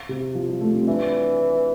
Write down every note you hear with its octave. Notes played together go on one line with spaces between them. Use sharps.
C3
F3
G3
A3
C4
E3 D4